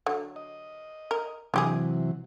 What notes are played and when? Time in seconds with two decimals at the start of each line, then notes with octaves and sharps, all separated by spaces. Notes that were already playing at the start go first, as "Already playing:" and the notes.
0.06 D3 F#3
0.36 D#5
1.11 A#4
1.54 C3 E3 F#3 D4 G4 G#4